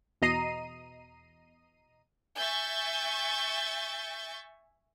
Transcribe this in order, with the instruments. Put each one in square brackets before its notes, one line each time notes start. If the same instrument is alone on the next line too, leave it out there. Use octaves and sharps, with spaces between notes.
[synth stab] E2 B2 D#5 A#5 C7 D#7
[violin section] E5 G#5 C#6 G6 A6